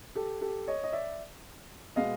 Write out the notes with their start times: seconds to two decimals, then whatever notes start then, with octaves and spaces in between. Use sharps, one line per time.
0.15 G4 A4
0.41 G4 A4
0.68 C#5 D#5
0.84 D#5
0.93 D5 E5
1.96 B2 G#3 B3 D#5 F5